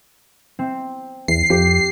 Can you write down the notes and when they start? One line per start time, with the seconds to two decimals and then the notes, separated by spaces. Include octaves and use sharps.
0.59 C4
1.28 E2 C7
1.50 F2 G4